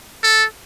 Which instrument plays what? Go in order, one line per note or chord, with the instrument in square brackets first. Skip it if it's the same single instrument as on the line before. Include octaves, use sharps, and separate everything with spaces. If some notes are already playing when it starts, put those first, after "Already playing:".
[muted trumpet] A4